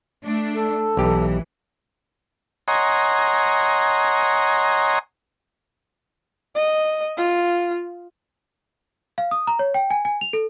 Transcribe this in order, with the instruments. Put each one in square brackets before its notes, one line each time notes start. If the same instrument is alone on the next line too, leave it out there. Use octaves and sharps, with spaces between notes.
[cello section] A3 D4
[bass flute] A4
[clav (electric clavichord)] B1 G4 [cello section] E3
[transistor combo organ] C#5 D#5 F#5 G#5 A#5 C6
[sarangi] D#5
F4
[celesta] F5
D#6
A#5
C#5
G5
G#5
G#5
F7
A4